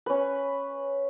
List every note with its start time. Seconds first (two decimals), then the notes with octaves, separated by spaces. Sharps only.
0.06 C#4 B4